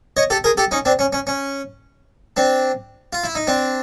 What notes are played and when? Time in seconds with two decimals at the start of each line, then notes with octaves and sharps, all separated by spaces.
0.17 C#5 D#5
0.30 G4 A4
0.44 G#4 A#4
0.57 G4 A4
0.71 C#4 D#4
0.85 C4 D4
0.99 C#4
1.13 C#4
1.27 C#4
2.37 C4 D4
3.13 F4
3.24 E4
3.35 D#4
3.47 C4 D4